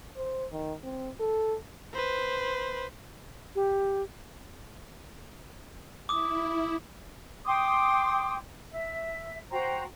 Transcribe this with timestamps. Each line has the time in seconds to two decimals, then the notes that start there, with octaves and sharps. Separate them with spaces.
0.16 C5
0.52 D#3
0.83 C4
1.20 A4
1.94 B4 C5
3.55 G4
6.09 E4 D6 D#6
7.46 G5 C6 D6 D#6
8.71 E5
9.50 F#4 C5 G5 A#5